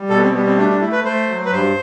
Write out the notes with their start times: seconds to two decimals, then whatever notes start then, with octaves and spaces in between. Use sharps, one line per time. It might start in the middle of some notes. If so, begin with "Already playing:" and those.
Already playing: G3
0.10 B2 A4
0.17 B3
0.22 C4
0.33 G3 B3
0.46 C4
0.57 A3 D4
0.69 D4
0.80 A3 E4
0.92 B4
1.04 A3 C5
1.29 F#3
1.46 B4
1.52 G2 C5